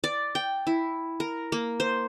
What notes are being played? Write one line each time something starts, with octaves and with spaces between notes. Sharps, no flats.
D5
G5
E4
A#4
A#3
C5